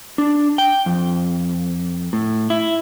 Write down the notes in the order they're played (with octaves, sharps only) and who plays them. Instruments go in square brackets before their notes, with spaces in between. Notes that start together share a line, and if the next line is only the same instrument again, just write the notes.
[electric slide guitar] D4
G5
F2
A2
E4